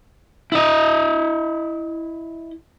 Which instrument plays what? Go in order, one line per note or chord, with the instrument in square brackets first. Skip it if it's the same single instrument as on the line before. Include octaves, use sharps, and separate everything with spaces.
[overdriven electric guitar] E4 D#5